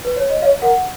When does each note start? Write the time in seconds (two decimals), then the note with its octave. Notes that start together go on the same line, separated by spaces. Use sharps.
0.05 B4
0.16 C#5
0.30 D#5
0.42 C#5 F5
0.62 A#4 F#5